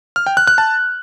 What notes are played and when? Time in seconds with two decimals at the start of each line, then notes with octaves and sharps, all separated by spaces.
0.16 F6
0.26 G5
0.37 F#6
0.47 F#6
0.58 A5